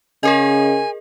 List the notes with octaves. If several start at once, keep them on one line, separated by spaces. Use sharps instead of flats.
C#3 G#4 A#4 D#5 G#5